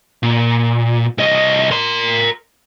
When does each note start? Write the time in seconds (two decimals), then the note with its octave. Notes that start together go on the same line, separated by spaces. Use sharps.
0.23 A#2
1.18 C2 D#5
1.71 A#4 C6